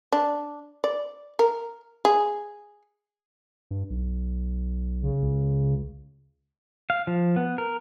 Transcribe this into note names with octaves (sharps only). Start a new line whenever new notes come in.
D4
D5
A#4
G#4
G2
B1
C#3
C#2
F5
F3
B3
A#4